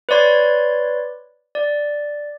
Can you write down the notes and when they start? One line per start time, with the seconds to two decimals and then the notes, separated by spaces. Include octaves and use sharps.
0.09 B4 C#5 D5 C6 G#6
1.55 D5